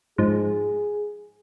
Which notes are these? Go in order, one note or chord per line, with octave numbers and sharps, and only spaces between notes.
G#2 F3 G#4